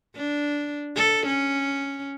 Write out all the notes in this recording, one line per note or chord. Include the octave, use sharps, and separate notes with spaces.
D4
A4
C#4